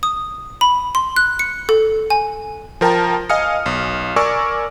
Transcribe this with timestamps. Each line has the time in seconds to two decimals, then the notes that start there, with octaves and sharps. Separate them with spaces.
0.03 D#6
0.61 B5
0.95 C6
1.16 F#6
1.39 C#7
1.69 A4
2.10 G#5
2.81 F3 A#4 G5 A5 A#5
3.29 D#5 F5 G#5 D#6 F6 C#7
3.66 B1
4.16 A#4 D5 G#5 C#6 D6 E6